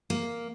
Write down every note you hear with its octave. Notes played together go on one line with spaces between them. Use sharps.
A#3